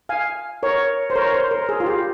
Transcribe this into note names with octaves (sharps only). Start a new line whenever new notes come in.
F5 G#5
A#4 C#5
C5
A#4 C#5
C5
A#4
G#4
F4
G4